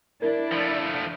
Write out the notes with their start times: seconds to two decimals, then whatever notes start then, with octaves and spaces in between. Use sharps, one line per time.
0.22 D4 E4 A#4 D5
0.52 F3 A3